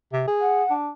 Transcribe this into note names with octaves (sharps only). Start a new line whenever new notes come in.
C3
G#4
F#5
D4